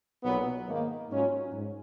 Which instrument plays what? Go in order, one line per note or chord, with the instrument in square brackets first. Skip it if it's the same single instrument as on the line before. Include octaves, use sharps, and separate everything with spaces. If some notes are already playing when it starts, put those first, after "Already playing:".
[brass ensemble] B1 A#2 F#3 B3
G#2 D#3 A#3
G#2 F#3 C#4 F4
G#2